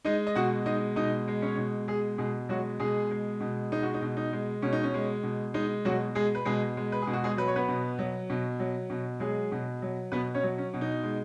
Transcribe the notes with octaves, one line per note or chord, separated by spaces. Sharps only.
G#3 D#4 D#5
D#5
B2 F#4 F#5
G#3 D#4 D#5
B2 D#4 D#5
G#3
C#4 C#5
B2
G#3 G#4
B2 G#3 G#4
F#3 G#3 F#4
B2 G#3 G#4
G#3
B2
G#3 D#4
F#4
D#4
B2
D#4
G#3
B2 C#4
D#4
C#4
G#3
B2
G#3 D#4
B2 F#3 F#4
G#3 G#4
B4
B2 G#3 G#4
G#3
B4
G#4
B2
F#4
G#3 G#4
F#3 B4
C#5
B3 B4
B2
F#3
B2
F#3
B2
F#3 G#3 G#4
B2
F#3
B2 B3 B4
C#4 C#5
F#3
C#4
B2
D#4
G#3